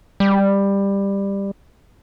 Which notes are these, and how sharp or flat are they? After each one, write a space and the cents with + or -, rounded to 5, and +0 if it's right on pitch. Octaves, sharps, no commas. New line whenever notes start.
G3 +15